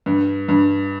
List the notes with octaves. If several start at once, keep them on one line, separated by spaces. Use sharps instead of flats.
G2
G2